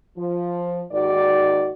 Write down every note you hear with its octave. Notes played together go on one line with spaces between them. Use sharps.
F3
D#2 G#2 D#3 F#4 D5